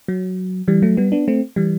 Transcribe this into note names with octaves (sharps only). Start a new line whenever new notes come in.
F#3
E3 G3
F#3 A3
G3 B3
B3 D4
A3 C4
E3 G3